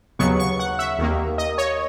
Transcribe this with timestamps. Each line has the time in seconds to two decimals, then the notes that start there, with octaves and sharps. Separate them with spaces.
0.19 D#2 C#3 F#3 B3 C#6
0.39 C#6
0.59 F#5
0.79 E5
0.99 D#2 D#3 A#3
1.38 D#5
1.58 C#5